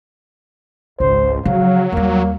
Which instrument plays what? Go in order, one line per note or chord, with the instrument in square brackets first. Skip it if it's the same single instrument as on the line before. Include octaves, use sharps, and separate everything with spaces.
[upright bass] G#1 [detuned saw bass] C#2 [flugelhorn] C5
[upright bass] C#3 F3 [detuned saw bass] F#3 [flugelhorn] F5
[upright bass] D#2 G3 [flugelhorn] A#3